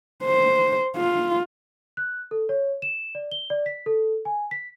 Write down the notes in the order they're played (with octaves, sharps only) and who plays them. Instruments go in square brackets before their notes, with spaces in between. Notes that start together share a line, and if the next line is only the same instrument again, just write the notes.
[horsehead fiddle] C5
F4
[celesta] F#6
A4
C#5
E7
D5
G7
D5
B6
A4
G#5
B6